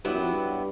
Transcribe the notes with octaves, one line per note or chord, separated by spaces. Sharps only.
G2 F#3 B3 E4 G4
F#2
F2
G2